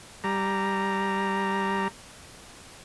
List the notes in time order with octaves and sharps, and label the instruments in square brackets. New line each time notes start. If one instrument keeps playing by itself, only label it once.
[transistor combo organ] G3 A#5